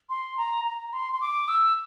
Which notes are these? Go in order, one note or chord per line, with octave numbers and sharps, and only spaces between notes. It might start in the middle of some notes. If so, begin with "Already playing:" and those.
C6
A#5
A#5
C6
C6
D6
E6